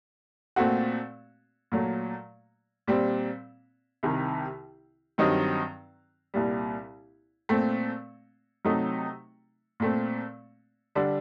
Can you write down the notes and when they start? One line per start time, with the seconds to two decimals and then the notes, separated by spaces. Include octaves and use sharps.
0.56 A#2 A3 C4 F#4
1.72 A#2 F#3 A3
2.88 A#2 G3 C4
4.03 C2 C3 D#3
5.18 G2 D#3 F#3 C4 D#4
6.34 C2 A#2 G3
7.49 A#2 A3 C4
8.65 C3 F#3 A3 D#4
9.80 A#2 A3 C4
10.95 D3 G3 D4